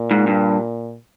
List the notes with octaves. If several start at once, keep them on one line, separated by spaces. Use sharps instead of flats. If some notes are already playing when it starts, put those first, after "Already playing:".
Already playing: A#2
G#2
G2